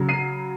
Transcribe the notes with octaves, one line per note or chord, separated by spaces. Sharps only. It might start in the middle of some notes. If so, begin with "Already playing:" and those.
Already playing: C#3 F#3
C7 D#7